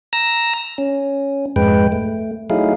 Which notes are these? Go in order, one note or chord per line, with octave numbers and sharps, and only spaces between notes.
A#5 E6 A#6
C#4
F2 G#2 G#3 B4 G5
A3
F#3 A3 D#4 E4 G#4 F5